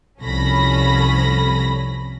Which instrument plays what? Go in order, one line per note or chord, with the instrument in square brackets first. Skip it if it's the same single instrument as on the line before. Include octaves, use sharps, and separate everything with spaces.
[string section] C2 F2 C#4 A4 B5 A#6